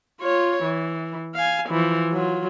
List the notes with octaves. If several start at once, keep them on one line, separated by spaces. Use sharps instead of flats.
F4 C#5
E3
F5 G#5
E3 F3
F#3 F4